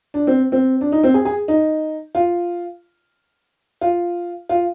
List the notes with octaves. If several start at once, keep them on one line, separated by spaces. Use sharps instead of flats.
D4
C4
C4
D4
D#4
C4
G#4
G#4
D#4
F4
F4
F4